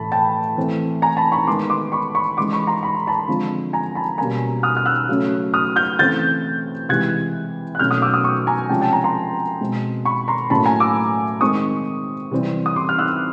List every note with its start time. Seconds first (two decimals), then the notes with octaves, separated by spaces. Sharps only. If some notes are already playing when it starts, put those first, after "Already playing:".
Already playing: A2 E3 A3 A5 B5
0.12 G5 A5
0.56 E3 A3 C4
1.02 G#5 A#5
1.17 A5 B5
1.32 B5 C#6
1.47 D#3 G#3 B3 C6 D6
1.70 C6 D6
1.92 B5 C#6
2.15 B5 C#6
2.37 C#3 E3 G#3 C6 D6
2.53 B5 C#6
2.67 A#5 C6
2.83 B5
2.95 C6
3.07 A5 B5
3.28 D3 F3 G#3 C4
3.73 G#5 A#5
3.95 A5 B5
4.18 B2 G3 A#3 C#4 G#5 A#5
4.63 D#6 F6
4.77 F6
4.86 E6 F#6
5.09 C#3 F#3 A3 C#4
5.54 D#6 F6
5.76 F6 G6
5.98 C#3 E3 A3 C4 G6 A6
6.89 C3 E3 G#3 F#6 G#6
7.75 F#6
7.79 B2 F#3 A3 C#4 F6 G6
7.91 D#6 F6
8.02 D6 E6
8.14 D#6 F6
8.24 C#6 D#6
8.47 G#5 A#5
8.69 C3 F3 G#3 C#4 G5 A5
8.81 G5 A5
8.92 G#5 A#5
9.04 A#5 C6
9.61 B2 G#3 C4
10.05 B5 C#6
10.28 A#5 C6
10.50 A2 F#3 A#3 C#4 A5 B5
10.65 G#5 A#5
10.80 D6 E6
11.41 D#3 G#3 C4 C#6 D#6
12.31 C3 E3 G3 C4
12.66 D#6
12.76 C6 D6
12.89 F6
12.98 E6 F#6